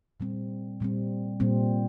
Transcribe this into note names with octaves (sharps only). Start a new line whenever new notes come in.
A#2 G3 C4
A#2 G3 C4
A#2 G3 C4